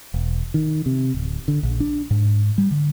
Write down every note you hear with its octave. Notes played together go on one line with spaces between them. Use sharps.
E1
D#3
C3
D1
D3
A#1
D4
G#2
G3
D3